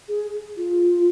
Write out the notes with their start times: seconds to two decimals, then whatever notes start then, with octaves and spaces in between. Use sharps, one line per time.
0.08 G#4
0.57 F4